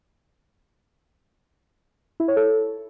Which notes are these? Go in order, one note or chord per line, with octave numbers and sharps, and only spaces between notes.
E4
C#5
A4